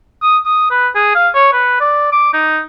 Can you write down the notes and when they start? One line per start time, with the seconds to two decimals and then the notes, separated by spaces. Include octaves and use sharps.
0.22 D#6
0.46 D#6
0.71 B4
0.95 G#4
1.15 F5
1.35 C#5
1.53 B4
1.80 D5
2.12 D6
2.33 D#4